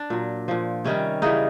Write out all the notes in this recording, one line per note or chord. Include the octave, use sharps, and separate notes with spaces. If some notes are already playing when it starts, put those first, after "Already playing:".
Already playing: D4
A#2 F#3
A#2 F3
C3 D#3 G3 C#4
C#3 E3 G3 D#4